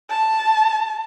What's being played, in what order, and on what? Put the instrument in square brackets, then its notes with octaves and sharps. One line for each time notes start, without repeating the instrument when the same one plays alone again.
[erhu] A5